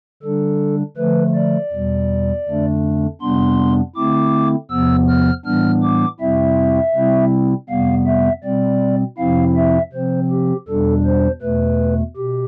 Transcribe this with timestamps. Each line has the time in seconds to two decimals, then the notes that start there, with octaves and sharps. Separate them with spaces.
0.22 D3 G3 D4 A4
0.97 D3 F3 A3 B4
1.35 D5
1.72 E2 B2 G3
2.46 F2 D3 A3 D4
3.21 F2 C3 G3 B3 D4 C6
3.96 D3 A3 C4 E4 D6
4.70 E2 C3 F3 B3 E6
5.08 F6
5.45 A2 E3 G3 B3 D4 F6
5.82 D6
6.20 F2 C3 G3 C4 E4 E5
6.95 C3 G3 C4 E4
7.69 F2 C3 G3 B3 F5
8.06 E5
8.43 B2 G3 C4 D5
9.18 F2 C3 F3 C4 E4 F5
9.56 E5
9.93 C3 F3 C4 C5
10.31 G4
10.68 E2 B2 G3 D4 A4
11.05 C5
11.42 E2 B2 A3 B4
12.17 B2 G4